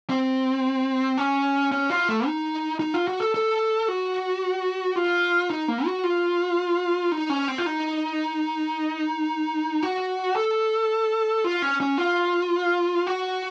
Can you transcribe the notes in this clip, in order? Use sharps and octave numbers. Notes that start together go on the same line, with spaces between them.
C4
C#4
C#4
F4
A3
D#4
D#4
F4
F#4
A4
A4
F#4
F4
D#4
A#3
F#4
F4
D#4
C#4
C4
F4
D#4
F#4
A4
F4
C#4
C#4
F4
F#4